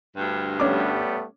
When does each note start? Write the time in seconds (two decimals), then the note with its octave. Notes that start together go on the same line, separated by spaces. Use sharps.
0.17 D2 G2
0.60 G3 A3 B3 C#4 D6